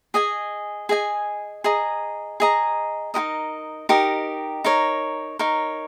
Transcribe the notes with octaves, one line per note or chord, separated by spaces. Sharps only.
G#4 D#5 G#5
G#4 D#5 G#5
G#4 D#5 A#5
G#4 D#5 A#5
D#4 G4 A#4 D#5
D#4 G4 A#4 D#5
D#4 A#4 C#5
D#4 A#4 C#5